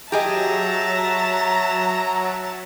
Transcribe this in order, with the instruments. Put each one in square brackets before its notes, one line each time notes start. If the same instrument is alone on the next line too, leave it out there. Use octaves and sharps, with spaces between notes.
[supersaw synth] F#3 [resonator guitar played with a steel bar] G4 G#4 D#5 [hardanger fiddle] E5 A5 [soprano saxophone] A#5